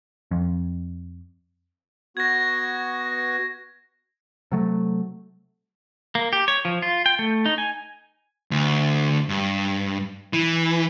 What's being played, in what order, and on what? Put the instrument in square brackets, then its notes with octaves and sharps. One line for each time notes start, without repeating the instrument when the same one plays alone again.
[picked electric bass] F2
[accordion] B3 F#4 [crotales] G#6 A#6
[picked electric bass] C3 F#3 A3
[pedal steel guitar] A#3
G4
C#5
F3
F4
G5
A3
D#4
G#5
[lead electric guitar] D2
G2
E3